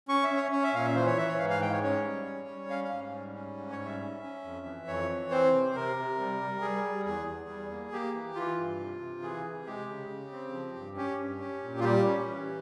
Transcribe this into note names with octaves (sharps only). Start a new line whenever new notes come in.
C#4 C#6
E5
C#4
C#5
C#4 C#5
E5
A#2 F5
E5
E3 C5
C#5
E3 E5
C#5
G#2 F5
F5
G#3 G5
C#5
C#4 C#5
G3
C#4
G3
C#4 F5
F5
G#2
G3
C#4
G#2
C#5
G3
E5
C#4
C#4
F2
E3
F2 C#5
E3
C4 C5
C3
C3 A#4
C3
G3
G3
G3 G#4
G3
E2 G#4
E2
G3
A#3
A#3 G4
E3
E3 F4
G2
C3
C3
E3 G#4
C3
G#3 G4
C#3
C#3
C4
F3
G2
C#4 G4
G2
C#4
A#2
F4
G3 G4
C#4
E3